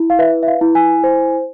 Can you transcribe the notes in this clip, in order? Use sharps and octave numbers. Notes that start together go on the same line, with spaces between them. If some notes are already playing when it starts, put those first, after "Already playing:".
Already playing: E4
F5
B4 E5
E5
F5
E4
G#5
C5